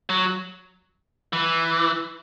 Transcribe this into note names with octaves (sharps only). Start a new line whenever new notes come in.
F#3
E3